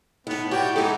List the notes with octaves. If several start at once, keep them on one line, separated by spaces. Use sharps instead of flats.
A2 D#3 B3
E4 F#4 G4 C#5 D5 G5
E3 G#3 D#4 F#4 G4 A4